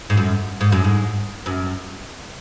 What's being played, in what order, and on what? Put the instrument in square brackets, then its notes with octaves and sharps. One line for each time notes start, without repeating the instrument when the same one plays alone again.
[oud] G#2
F#2
G#2
F#2
G#2
F#2